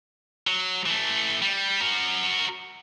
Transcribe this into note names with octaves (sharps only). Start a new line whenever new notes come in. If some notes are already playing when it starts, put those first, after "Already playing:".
F#3
E3 A3
G3
F#4 A#4